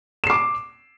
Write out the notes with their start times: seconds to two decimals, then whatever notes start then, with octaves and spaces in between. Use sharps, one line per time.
0.24 E7
0.27 C7
0.30 D6